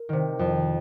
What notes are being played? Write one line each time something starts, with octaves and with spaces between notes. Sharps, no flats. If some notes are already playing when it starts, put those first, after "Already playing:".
Already playing: A#4
C3 D#3
F2